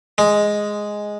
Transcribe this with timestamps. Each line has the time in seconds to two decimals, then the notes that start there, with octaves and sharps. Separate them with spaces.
0.18 G#3